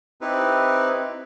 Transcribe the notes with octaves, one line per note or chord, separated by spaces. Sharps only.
C4 D#4 E4 G4 B4